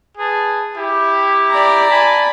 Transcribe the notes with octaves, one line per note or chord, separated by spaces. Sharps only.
G#4 B4 A5
E4 G4
D5 A#5
G#5 A5 B5